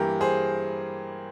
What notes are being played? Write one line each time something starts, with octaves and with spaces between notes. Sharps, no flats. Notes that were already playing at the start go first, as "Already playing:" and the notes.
Already playing: G2 E3 A#3 G4 A#4
G#4 C5